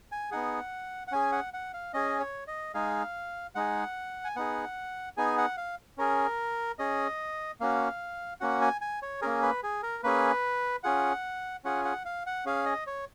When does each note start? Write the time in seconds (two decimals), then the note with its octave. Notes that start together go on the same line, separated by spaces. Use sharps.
0.12 G#5
0.31 B3 D#4 G#4 F#5
1.07 F#5
1.12 C#4 G#4 G#5
1.32 F#5
1.54 F#5
1.74 F5
1.93 C#4 G#4 D#5
2.20 C#5
2.48 D#5
2.74 G#3 D#4 G#4 F5
3.55 G#3 D#4 G#4 F#5
4.24 G#5
4.36 B3 D#4 G#4 F#5
5.17 B3 D#4 G#4 G#5
5.38 F#5
5.57 F5
5.98 C#4 G#4 A#4
6.79 C#4 G#4 D#5
7.60 A#3 C#4 F#4 F5
8.41 A#3 C#4 F#4 F#5
8.62 G#5
8.81 G#5
9.02 C#5
9.22 A#3 C#4 G#4 A#4
9.42 B4
9.63 G#4
9.83 A#4
10.03 A#3 C#4 G#4 B4
10.84 C#4 F4 G#4 F#5
11.64 C#4 F4 G#4 F#5
11.85 F#5
12.05 F5
12.26 F#5
12.45 C#4 G#4 F5
12.66 D#5
12.87 C#5